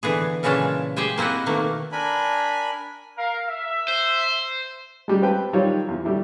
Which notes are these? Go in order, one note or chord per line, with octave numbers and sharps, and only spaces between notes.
D3 E3 B3 G#4
A#2 C#3 E3 G#3 C#4 A5
G4 G#4 C5 G5 G#5
A#3 C4 E4 D#5 F#5
B2 D#3 A3 A#3
D4 A#4 G#5 B5
A#4 F5
E5
C5
G3 G#3
C4 B4 G5 A5
D#3 F#3 G3 F4 C#5
E2
D3 G3 E4 F#4